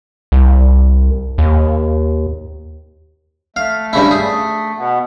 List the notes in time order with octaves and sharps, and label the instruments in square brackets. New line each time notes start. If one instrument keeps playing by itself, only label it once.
[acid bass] C2
D#2
[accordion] A3 [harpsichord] F5
[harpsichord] G2 C#3 E4
G#4
[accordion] B2 B3